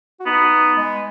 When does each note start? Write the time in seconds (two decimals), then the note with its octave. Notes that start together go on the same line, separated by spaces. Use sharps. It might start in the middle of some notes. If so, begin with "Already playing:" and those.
0.20 F#4
0.26 B3 D#4
0.77 G#3